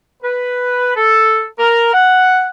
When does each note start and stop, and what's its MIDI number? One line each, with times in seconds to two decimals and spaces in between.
0.22 0.93 71
0.96 1.44 69
1.58 1.91 70
1.94 2.46 78